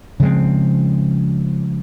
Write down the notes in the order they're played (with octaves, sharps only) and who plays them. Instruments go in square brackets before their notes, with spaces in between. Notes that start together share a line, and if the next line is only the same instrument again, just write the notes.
[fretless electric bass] C#3 F3 G#3 C4